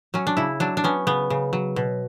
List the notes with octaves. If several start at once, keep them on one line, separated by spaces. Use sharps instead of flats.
F#3 C#4
D4
C#3 E4
F#3 D4
D4
B3 C#4
C#3 B3
C#3
F#3
B2